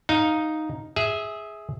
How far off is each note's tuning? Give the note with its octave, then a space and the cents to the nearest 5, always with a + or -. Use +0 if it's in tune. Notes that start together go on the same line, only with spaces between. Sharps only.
D#4 +0 F5 +0
G#4 +0 E5 -15